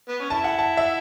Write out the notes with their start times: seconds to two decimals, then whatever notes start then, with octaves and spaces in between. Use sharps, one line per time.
0.09 B3
0.20 C#4
0.30 E4 A5
0.44 F#5
0.59 A5
0.77 E5